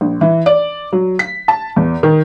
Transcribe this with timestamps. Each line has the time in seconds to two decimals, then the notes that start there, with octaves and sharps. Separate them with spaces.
0.01 A#1
0.21 E3
0.46 D5
0.93 F#3
1.19 B6
1.48 A5
1.76 E2
2.03 D#3